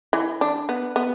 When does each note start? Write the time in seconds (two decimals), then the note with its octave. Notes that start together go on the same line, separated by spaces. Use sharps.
0.13 E3
0.41 D4
0.69 B3
0.96 B3